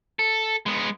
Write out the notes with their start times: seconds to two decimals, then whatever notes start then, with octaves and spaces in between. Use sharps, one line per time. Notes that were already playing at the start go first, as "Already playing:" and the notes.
0.19 A4
0.66 G#3 B3